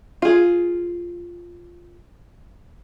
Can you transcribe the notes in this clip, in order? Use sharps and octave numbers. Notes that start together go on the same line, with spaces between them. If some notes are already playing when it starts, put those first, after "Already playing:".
F4 G#4